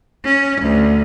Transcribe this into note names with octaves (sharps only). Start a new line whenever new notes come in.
C#4
D2